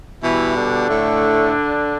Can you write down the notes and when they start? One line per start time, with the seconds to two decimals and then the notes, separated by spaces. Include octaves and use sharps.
0.22 B2 E3 G3 E4
0.55 D3 D4
0.88 A2 A3